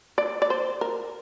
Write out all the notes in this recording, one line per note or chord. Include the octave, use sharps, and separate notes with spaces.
D5
D5
C5
A#4